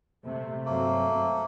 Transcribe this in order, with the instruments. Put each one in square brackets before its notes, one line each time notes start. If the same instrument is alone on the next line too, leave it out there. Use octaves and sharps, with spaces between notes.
[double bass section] C3 A3
[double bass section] G2 F#3 C4 [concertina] A3 A#3